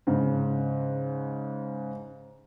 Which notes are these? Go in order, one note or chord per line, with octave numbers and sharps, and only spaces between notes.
G#2 C#3